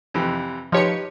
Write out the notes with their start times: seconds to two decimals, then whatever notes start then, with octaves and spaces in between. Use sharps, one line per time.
0.14 F2 C3 E3
0.72 F3 D#4 G4 B4 C#5 C#7